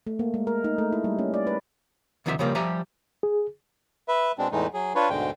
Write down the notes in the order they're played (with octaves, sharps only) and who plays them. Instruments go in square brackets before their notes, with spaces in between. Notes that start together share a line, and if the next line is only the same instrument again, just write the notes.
[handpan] A3
A#3
G#3
A#4
D#4
A3
E4
G3
C#4
D5
B4
[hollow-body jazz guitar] D2 C3 D#3 F3 G#4 E5
C#3 F3 G3 A#3
F3 G3 G4 E5 G#5 A#5
[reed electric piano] G#4
[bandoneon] B4 E5
B2 G#3 C4 D4
E2 A2 E3 G#3 A3 D#4
F#3 G#4
D4 F4 B4 C#5
D2 G#2 B2 D3 G#3 G5